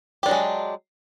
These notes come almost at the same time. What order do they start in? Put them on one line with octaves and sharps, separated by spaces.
G4 D4 F#3 G#3